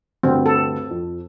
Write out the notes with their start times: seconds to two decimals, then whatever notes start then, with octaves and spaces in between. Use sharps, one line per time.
0.23 D2 G2 D3 C4
0.46 A4
0.91 F2